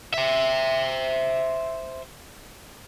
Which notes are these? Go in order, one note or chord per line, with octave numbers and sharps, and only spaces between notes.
C5 E5